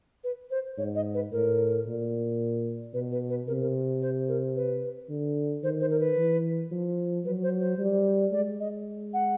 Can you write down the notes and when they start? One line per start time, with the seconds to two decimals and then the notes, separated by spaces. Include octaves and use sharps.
0.24 B4
0.51 C5
0.78 G#2 C#5
0.95 D#5
1.14 B4
1.32 A2 A#4
1.86 A#2
2.93 B2 B4
3.12 B4
3.29 B4
3.47 C3 A#4
3.61 A#4
4.02 C5
4.28 A#4
4.56 B4
5.09 D3
5.63 D#3 C5
5.81 C5
5.90 A#4
6.00 B4
6.17 E3
6.71 F3
7.25 F#3 B4
7.43 C5
7.61 C5
7.78 G3
8.32 G#3 D5
8.60 D#5
9.13 F#5